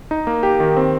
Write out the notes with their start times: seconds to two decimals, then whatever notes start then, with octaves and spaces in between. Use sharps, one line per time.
0.11 D#4
0.27 A#3
0.43 G4
0.60 D#3
0.76 C4